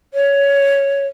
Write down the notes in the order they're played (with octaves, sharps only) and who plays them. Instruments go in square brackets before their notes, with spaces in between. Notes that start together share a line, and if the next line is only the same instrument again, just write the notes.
[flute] C#5